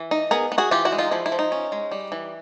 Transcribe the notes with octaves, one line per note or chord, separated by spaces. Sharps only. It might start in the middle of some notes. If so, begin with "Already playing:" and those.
Already playing: E3
D#4
B3 G#4 A#4
B3
F#4 G#4
E3 F4 G4
E4 F#4
G#3
D#4 F4
F3 E4
E4
F3
D#4
C#4
G#3
G3
E3